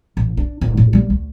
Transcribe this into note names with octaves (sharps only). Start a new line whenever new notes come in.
A1
D4
D1 F4
A2
G3 A#3
D2